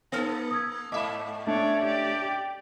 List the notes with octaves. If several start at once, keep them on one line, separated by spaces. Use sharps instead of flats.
A#3 D#4 A4 F6 A#6
D#6 E6 G#6
G#2 D#5 E5 B5 D6
A3 C#4 D4 C#5 D5
G4 D5
G5